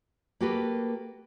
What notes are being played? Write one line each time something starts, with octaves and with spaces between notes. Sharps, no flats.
A#3 F#4 G4 A4 B4